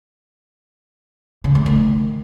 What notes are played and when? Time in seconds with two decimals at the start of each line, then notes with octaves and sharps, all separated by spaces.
1.44 C#3
1.55 A3
1.66 D#3